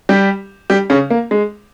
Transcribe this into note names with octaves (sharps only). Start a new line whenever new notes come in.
G3 G4
G3 G4
C#3 C#4
A#3
G#3